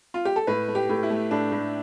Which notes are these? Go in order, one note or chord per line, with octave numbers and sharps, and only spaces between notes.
F4
G4
A4
A2 B4
A3
G4
A2
E4
A3
A2 D4
A2